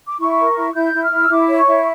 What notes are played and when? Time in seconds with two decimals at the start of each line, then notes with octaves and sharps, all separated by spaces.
0.08 D6
0.20 E4 C#6
0.38 A#4
0.56 E4
0.74 E4 G6
0.94 E4
1.03 F6
1.12 E4
1.20 E6
1.30 E4 D6
1.49 C#5
1.58 C#6
1.68 E4